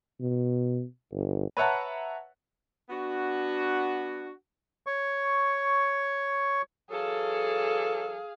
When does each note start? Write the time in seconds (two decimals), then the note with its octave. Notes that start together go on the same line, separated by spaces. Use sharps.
0.20 B2
1.12 G1
1.57 B4 C#5 E5 F#5 A5 A#5
2.89 B3 D4 F#4
4.86 C#5 C#6
6.90 E3 F#3 G#4 A4 F5